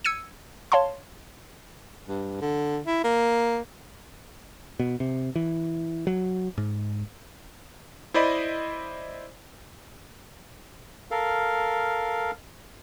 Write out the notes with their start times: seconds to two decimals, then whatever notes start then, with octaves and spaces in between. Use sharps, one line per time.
0.05 E6 G#6 C#7 D#7
0.72 C#5 F5 A5 C6
2.07 G2
2.41 D3
2.87 E4
3.04 A#3
4.80 B2
5.00 C3
5.36 E3
6.07 F#3
6.58 G#2
8.14 E4 C5 D5 D#5 B5
11.11 A4 A#4 F5